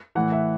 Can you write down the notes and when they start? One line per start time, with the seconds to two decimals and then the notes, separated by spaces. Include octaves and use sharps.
0.15 A2 E3 F#5
0.32 E5